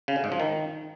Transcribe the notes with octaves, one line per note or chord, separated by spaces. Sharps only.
C#3
D3
G#2
F3
D#3